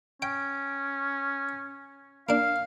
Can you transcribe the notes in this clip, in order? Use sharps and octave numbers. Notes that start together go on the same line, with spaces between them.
C#4 G5
A#3 D4 F5